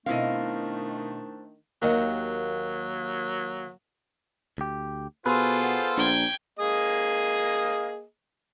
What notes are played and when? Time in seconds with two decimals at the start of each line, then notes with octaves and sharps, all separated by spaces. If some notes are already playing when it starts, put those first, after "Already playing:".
0.06 B2 D#3 A3 C4 D4 E4 D#5 F5
1.82 D#2 F#3 D#5 F#5
4.58 D2 G4
5.26 B2 F4 G#4 A4 B4 C5
5.64 B3
5.97 A#1 G5 G#6
6.59 A#3 G#4 D#5